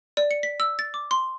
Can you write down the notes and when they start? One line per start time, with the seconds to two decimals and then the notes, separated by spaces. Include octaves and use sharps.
0.17 D5
0.31 C#7
0.43 B6
0.60 E6
0.79 A6
0.94 D6
1.11 C6